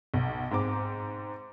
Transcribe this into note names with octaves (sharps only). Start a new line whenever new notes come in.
B1
G#2 C4 D6